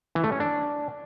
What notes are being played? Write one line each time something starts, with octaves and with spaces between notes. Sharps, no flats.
E3
A3
C#4
D4